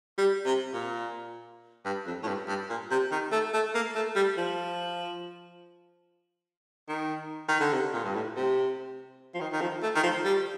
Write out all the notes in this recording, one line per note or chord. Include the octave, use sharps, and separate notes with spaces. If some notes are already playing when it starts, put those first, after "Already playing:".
G3
C3
A#2
G2
F2
A2
G2
G2
A#2
C3
D#3
A3
A3
A#3
A3
G3
F3
D#3
D#3
D3
C3
A#2
G2
A2
C3
F3
D#3
D#3
F3
A3
D#3
F3
G3